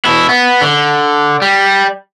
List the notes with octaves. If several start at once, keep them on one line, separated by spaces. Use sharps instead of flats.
B2 E4
B3
D3
G3